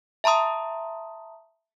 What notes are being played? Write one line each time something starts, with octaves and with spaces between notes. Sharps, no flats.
E5 A5 A#5 C6 D#6